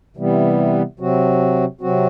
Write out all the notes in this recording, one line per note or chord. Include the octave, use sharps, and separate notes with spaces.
C3 E3 G3 B3
C3 F#3 C4 F#4
C3 F#3 C4 F#4